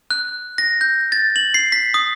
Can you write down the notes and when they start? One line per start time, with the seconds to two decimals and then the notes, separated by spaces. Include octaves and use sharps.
0.11 F#6
0.58 A#6
0.81 G6
1.12 A6
1.36 F#7
1.54 C7
1.72 B6
1.94 D#6